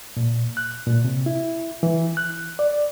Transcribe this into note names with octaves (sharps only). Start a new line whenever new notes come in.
A#2
F#6
A#2
C3
E4
E3
F#6
D5